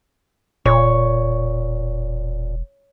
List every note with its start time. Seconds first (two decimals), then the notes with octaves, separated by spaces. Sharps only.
0.66 E1 A#2 C#5